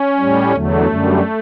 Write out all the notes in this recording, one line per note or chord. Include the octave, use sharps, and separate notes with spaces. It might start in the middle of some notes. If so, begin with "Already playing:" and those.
Already playing: C#4
A2 G3
E2 D3 F#3 A3
F#2 D3 G3